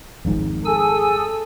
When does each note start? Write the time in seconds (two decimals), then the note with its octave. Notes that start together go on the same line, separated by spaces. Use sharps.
0.25 G#1 F2 G#2
0.65 G#4 A4 G#5 E6